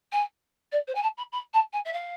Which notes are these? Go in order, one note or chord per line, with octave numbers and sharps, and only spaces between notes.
G#5
D5
C5
G#5
A5
B5
B5
A5
G#5
E5
F5